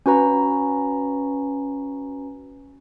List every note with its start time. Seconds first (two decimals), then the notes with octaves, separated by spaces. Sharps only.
0.06 C#4 F#4 B4 A#5